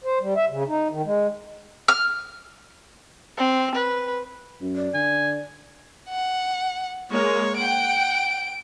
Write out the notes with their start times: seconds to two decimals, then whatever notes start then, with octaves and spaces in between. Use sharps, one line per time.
0.04 C5
0.20 G3
0.36 E5
0.49 C#3
0.68 D#4
0.90 D#3
1.05 G#3
1.88 F6
3.37 C4
3.75 B4
4.61 F#2
4.75 D5
4.94 D3 G#5
6.09 F#5
7.11 G#3 A#3 C#5
7.57 F#5 G5 D7